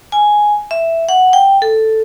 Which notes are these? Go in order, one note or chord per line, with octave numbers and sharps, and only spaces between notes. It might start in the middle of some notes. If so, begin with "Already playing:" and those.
G#5
E5
F#5
G5
A4